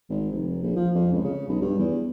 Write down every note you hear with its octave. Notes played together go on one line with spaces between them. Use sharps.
G#1
F1
A#1
F3
F2
C#2
C#3
B1
G2
E2